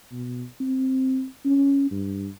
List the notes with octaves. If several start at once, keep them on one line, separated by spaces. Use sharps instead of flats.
B2
C4
C#4
G2